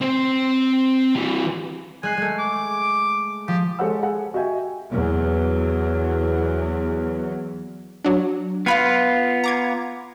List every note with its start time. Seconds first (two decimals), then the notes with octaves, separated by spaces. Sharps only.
0.01 C4 C5
1.16 E3 G3
2.03 G#3 G#5 F#6 C7
2.17 G#3 A3
2.39 D6
3.48 F3 G4
3.79 G#3 A4 C5 C#5 F#5 E6
4.03 G#4 F#5
4.34 F#4 D#5 E5 G5 G#5
4.92 E2 F#3
8.04 F#3 D4
8.66 B3 F4 F5 B5 G#6
9.44 A#5 D6 G#6